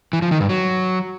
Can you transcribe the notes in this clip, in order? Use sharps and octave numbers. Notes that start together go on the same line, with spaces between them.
E3
F3
D#3
G2
F#3